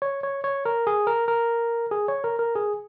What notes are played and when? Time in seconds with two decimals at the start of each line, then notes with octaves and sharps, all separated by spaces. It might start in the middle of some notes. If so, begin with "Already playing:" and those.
0.02 C#5
0.23 C#5
0.44 C#5
0.65 A#4
0.87 G#4
1.07 A#4
1.28 A#4
1.91 G#4
2.08 C#5
2.24 A#4
2.39 A#4
2.56 G#4